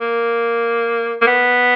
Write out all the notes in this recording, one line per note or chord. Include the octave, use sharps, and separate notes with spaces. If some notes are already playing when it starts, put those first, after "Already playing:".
A#3
A#3
B3